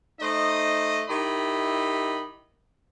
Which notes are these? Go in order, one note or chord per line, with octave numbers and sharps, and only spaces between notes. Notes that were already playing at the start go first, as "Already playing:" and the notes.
A3 D#4 C5 D#5
D#3 E4 G4 D#5 B5